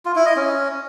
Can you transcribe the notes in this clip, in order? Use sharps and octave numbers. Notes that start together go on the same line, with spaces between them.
F4
E4
D#5
C#4